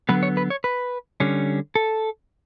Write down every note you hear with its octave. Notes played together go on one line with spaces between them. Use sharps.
D3 F#3 B3 B4
C#5
B4
C#5
B4
D3 G3 C#4
A4